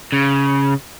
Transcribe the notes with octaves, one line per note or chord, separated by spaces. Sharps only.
C#3